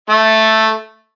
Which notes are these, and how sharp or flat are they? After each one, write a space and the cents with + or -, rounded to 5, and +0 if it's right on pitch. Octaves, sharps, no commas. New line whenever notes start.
A3 +0 E5 +0 C#6 -20